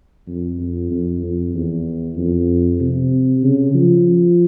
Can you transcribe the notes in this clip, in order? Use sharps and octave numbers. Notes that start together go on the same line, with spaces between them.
F2
F2
F2
F2
E2
F2
C3
C#3
F3